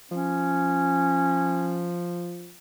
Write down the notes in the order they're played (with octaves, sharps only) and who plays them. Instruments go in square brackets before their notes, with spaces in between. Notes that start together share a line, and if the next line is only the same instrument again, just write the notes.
[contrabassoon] F3 [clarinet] C#4